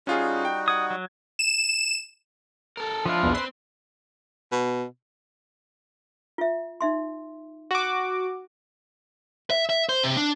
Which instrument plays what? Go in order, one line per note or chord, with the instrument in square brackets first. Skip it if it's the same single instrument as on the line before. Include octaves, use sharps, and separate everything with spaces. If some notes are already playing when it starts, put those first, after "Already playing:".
[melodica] G3 D#4 F#4 [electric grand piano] C#4 F4 G#4
[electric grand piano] G5
[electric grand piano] F#5 G#6 [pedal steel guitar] D#6
[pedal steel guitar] F#3
[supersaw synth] E7
[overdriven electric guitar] A4 A#4
[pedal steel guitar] F3 F4 [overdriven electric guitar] D4 E4
[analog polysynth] B1 E2
[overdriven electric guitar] C4 [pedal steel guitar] B4 [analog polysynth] C6
[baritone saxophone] B2
[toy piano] F4 E5
D#4 E5 C6
[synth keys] F#4 D6
[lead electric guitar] E5
E5
C5
C3
D4